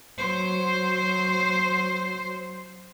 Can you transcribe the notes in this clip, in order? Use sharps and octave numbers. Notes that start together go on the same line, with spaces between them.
F#3 C5